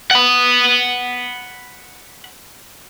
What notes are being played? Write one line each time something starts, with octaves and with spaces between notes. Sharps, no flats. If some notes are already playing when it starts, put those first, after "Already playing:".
F#5 B5